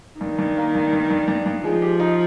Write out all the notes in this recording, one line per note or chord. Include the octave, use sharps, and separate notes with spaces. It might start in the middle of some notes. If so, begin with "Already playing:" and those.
G2 D#3
G2
A#3
G2
G2
G2
G2
G2
F3 G#3
G4
D#4